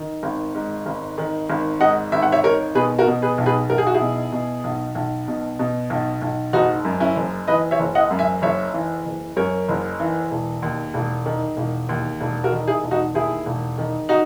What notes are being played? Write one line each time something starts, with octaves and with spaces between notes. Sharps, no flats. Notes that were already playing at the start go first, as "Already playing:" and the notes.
Already playing: D#3
G#1
G#2
G#1
D#3
G#1
G#2 D#5 F#5
G#1 E5
F#5
C#5 E5
D#3 A#4 C#5
B2 G#4 B4
F#4 A#4
B2
G#4 B4
B1
G#4 B4
B1 A#4
G#4
F#4
E4 G#4
B2
B2
B1
B1
B2
B2
B1
B1
F#1 D#4 F#4
F#2
C#4 E4
F#1
E3 B4 D#5
C#5 E5
F#1
D#5 F#5
F#2
E5 G#5
F#1 C#5 E5
E3
F#1
F#2 A#4 C#5
F#1
E3
E1
D#2
E1
D#3
E1
D#2
E1
F#4 A#4
D#3
E4 G#4
E1
D#4 F#4
D#2 E4 G#4
E1
D#3
D#4 F#4